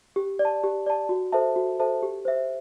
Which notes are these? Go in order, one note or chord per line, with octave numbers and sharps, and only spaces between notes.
G4
D5
A5
G4
D5 A5
F#4
A4 C5 E5 A5
F#4
A4 C5 E5 A5
G4
C5 E5